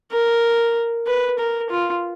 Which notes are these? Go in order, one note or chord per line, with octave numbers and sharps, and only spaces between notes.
A#4
B4
A#4
F4